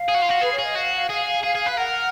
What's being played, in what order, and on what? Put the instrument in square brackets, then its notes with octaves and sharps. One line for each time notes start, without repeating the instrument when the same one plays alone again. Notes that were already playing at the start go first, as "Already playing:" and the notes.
Already playing: [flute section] F5
[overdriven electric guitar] G#4
F#4
F4
F#4
[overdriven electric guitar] G#4 [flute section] B4
[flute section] C#5
[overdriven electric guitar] G#4
[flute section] D#5
[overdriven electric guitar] F#4 [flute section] F5
[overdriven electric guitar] G#4 [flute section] F5
[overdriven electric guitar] G#4 [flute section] F5
[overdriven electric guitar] G#4
B4
[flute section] F5
[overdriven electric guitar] A#4 [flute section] F#5